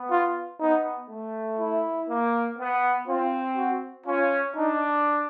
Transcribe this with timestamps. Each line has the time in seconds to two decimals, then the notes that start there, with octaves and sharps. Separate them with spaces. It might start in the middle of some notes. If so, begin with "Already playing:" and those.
Already playing: B3
0.11 F4
0.60 B3 D#4
1.10 A3
1.59 E4
2.09 A#3
2.58 B3
3.08 C4 F4
3.56 F#4
4.06 C#4 F4
4.56 D4 D#4